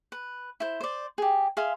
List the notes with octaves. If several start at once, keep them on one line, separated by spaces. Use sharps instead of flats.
B4
E4 C5
C5 D5
G4 G#4
G#4 E5 F5 C6